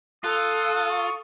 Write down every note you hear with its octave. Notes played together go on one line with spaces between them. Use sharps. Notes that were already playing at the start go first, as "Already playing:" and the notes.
F4 A4 D#6 F#6
C#6